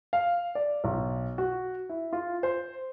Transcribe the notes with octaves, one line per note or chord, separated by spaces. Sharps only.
F5
D5
B1
F#4
E4
F4
C5